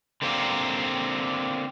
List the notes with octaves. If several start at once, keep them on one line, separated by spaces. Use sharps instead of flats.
D3 A#3 C4 G4